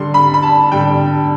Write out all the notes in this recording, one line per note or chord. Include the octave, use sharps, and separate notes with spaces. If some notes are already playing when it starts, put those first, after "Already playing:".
Already playing: D3 G3 C6
B5
B5
A5
D3 G3 G5